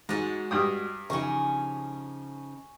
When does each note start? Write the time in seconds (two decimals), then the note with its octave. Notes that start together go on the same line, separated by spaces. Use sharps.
0.09 G#2 G#3 F#4
0.51 G2 G5 D#6
1.10 C#3 F3 D#4 G#5 C#6